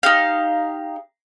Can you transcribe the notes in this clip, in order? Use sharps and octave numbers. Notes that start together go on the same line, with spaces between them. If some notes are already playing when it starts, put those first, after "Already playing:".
D#4 G4 F5